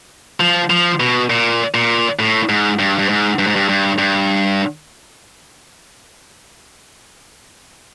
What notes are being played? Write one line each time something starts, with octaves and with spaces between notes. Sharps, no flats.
F3
F3
B2
A#2
A#2
A2
G#2
G2
G2
G#2
G2
G#2
G2
G2
G2